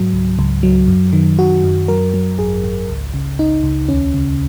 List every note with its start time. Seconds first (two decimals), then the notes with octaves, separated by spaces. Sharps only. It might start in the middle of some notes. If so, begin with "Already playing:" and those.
Already playing: G#2 F#3
0.13 C#2
0.39 C#2
0.63 F#3
0.88 F#2
1.13 D#3
1.39 D#3 F#4
1.64 F#2
1.88 F#3 A#4
2.14 F#3
2.38 G#1 G#4
2.64 G#1
2.89 C#2
3.14 C#3
3.39 C#2 D#4
3.64 C#2
3.88 D#2 C#4
4.14 C#3